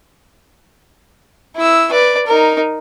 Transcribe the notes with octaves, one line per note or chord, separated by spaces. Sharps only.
E4 E6
B4 D5
D#4 A#4